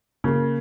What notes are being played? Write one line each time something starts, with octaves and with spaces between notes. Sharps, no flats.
C#3 A#3